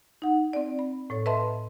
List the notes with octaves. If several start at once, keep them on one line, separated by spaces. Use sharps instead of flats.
D#4 F#5
C4 D5
B5
A2 A4 C#5
B4 D#5 E5 A5 B5 C6